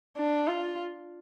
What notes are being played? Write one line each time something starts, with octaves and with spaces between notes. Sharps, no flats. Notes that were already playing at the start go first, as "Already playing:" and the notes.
D4
F4